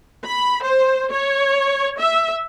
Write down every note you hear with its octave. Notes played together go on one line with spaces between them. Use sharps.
B5
C5
C#5
E5